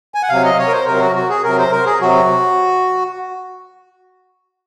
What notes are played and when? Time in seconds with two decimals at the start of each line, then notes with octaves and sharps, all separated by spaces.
0.15 G#5
0.23 F#5
0.29 C3 F#3 F5
0.45 D#5
0.59 C#5
0.68 A#4
0.72 C5
0.87 C3 F#3 A#4
1.01 F#4
1.15 F#4
1.29 G#4
1.44 C3 F#3 A#4
1.59 C5
1.72 A#4
1.86 G#4
2.01 C3 F#3 F#4